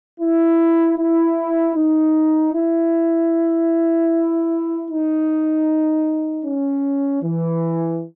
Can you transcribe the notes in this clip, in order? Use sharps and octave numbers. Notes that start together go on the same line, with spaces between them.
E4
E4
D#4
E4
D#4
C#4
E3